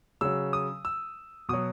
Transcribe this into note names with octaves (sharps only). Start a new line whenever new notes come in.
C#3 F#3 E6
D#6
E6
B2 F#3 D#6